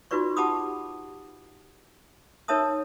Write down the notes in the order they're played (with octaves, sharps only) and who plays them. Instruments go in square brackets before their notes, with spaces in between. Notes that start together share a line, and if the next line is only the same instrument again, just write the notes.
[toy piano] D#4 F4 F#4 B4 D5 C#6
G4 F#5 A5 B5 D6 D#6
D#4 A#4 C#5 E5 A5 D#6